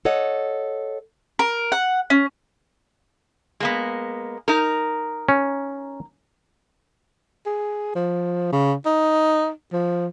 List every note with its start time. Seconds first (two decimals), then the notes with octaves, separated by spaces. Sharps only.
0.05 A4 C#5 D#5 F#5
1.39 A#4
1.72 F#5
2.10 C#4
3.60 G#3 A#3 B3
4.48 D#4 A#4
5.29 C#4
7.46 G#4
7.95 F3
8.52 C#3
8.86 D#4
9.73 F3